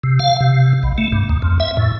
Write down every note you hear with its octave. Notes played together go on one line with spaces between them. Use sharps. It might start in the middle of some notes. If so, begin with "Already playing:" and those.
C3
F5
C3
B1
A3
G2
D#2
F2
E5
A2